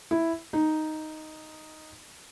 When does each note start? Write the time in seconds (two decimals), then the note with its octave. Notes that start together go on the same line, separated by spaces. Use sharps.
0.11 E4
0.53 D#4